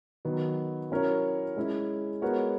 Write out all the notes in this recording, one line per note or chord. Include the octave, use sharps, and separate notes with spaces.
D#3 F#3 B3
F#3 C#4 E4 A#4 C#5
G#3 C#4 E4
G#3 B3 F#4 A#4 C#5